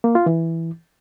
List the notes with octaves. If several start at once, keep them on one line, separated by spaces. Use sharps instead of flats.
A#3
F4
E3